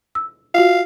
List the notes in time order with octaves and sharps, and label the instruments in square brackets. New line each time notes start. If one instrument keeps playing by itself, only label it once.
[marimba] E6
[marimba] F4 F#4 [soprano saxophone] F5